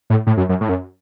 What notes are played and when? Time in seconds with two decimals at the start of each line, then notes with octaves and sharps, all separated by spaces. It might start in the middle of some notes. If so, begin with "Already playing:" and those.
0.10 A2
0.27 A2
0.37 F#2
0.49 F#2
0.61 A2
0.69 F#2